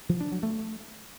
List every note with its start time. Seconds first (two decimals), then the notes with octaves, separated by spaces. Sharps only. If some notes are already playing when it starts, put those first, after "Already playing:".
0.09 F3
0.20 D4
0.32 F#3
0.43 A3